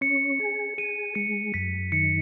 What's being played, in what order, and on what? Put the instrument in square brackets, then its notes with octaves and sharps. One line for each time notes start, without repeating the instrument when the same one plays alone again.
[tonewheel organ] C#4 [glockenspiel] C#7
[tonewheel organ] G#4
[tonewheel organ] G#4 [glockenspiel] D#7
[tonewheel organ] G#3 [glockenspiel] C#7
[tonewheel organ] F#2 [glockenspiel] B6
[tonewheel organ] D#3 [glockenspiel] C#7